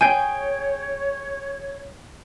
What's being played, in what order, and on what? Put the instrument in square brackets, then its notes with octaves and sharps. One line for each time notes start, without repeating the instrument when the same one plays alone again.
[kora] G#4 G5 [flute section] C#5 [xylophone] G#5 [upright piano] G6 G#6 D7